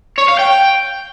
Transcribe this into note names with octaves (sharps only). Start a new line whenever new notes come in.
C#5
F5
G5